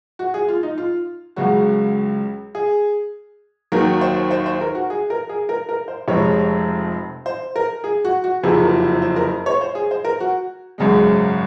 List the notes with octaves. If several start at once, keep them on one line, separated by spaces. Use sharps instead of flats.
F#4
G#4
F4
D#4
F4
C#2 C#3 F#3 F#4
G#4
D#2 D#3 F#3 A#4
C5
C5
C5
A#4
F#4
G#4
A#4
G#4
A#4
A#4
C5
F1 F2 C3 F3 G#3 C#5
C5
A#4
G#4
F#4
F#4
F#1 F2 C3 F#3 G#4
A#4
C5
C5
A#4
C#5
C5
G#4
C5
A#4
F#4
G#1 F#2 C#3 G#3